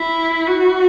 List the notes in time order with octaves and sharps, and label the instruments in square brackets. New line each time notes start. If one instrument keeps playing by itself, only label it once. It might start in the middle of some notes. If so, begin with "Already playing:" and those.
Already playing: [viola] E4
F#4